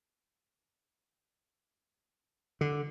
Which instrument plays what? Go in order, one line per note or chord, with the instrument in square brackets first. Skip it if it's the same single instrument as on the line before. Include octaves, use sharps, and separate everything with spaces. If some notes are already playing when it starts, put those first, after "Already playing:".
[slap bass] D3